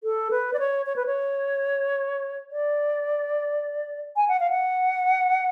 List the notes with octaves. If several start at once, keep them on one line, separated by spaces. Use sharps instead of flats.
A4
B4
D5
C#5
C#5
B4
C#5
D5
G#5
F#5
F5
F#5